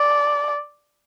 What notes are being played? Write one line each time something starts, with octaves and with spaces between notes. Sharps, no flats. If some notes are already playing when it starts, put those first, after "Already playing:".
Already playing: D5